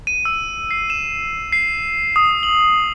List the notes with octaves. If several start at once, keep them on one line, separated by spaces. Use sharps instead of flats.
D#7
E6
C7
E7
C7
D#6
F#7